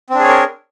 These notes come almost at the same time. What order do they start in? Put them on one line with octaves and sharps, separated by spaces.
C4 D4 G#4 C#5 A#4